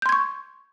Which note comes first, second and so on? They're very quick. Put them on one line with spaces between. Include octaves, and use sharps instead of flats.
G6 C6 G#6 C#6